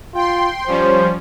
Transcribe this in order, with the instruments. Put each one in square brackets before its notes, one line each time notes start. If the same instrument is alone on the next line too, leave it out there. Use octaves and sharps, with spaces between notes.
[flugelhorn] F4 [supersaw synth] G5 C6
[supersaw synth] F3 G3 C#4 [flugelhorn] C5